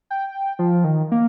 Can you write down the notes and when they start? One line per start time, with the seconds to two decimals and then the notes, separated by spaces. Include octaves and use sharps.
0.10 G5
0.59 F3
0.84 D#3
1.12 A#3